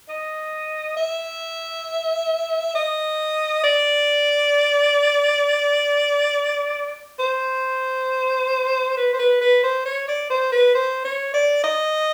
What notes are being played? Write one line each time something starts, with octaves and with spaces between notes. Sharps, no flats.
D#5
E5
D#5
D5
C5
B4
C5
B4
B4
C5
C#5
D5
C5
B4
C5
C#5
D5
D#5